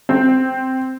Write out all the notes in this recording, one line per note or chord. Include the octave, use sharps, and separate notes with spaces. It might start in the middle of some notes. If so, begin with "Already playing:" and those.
C4